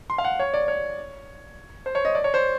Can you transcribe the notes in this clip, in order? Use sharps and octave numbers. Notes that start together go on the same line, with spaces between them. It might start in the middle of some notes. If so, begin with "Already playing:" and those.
C6
F5
F#5
C#5
D5
C#5
C5
C#5
D#5
D5
C#5
C5